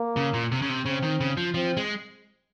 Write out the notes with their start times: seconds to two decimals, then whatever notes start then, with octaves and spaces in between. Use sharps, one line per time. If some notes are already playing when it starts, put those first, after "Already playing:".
Already playing: A#3
0.17 C#3
0.34 A#2
0.52 C3
0.62 C#3
0.69 C3
0.86 C#3 C4
1.03 D#3
1.21 C#3
1.37 F3
1.54 F3 C4
1.77 G#3